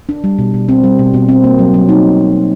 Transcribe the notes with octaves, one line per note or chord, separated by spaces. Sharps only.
D4
G3
B2
B2
C4
G3
B2
B2
C4
A#3
F#3
F#3
D#4